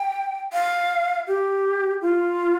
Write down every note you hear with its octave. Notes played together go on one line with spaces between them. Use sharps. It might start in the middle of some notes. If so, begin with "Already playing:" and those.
Already playing: G5
F5
G4
F4